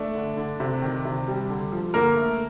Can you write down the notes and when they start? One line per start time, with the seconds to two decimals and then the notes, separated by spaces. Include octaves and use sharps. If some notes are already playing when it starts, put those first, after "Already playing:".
Already playing: A3 D4
0.15 D3
0.37 D3
0.60 C3
0.82 D#3
1.05 C3
1.28 G3
1.50 D3
1.72 F3
1.94 D3 A#3 A#4
2.16 A3